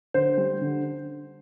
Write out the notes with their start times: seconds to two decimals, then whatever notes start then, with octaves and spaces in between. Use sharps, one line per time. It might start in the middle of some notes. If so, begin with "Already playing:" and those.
0.14 D3 C5
0.38 G3
0.61 D3